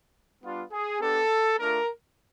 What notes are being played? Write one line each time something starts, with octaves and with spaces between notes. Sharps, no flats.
G3 B3 D4 F4
G#4
B3 D4 G4 A4
A3 D4 F4 A#4